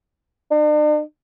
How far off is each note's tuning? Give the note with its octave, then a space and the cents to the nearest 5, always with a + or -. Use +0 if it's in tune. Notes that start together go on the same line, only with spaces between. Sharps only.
D4 +45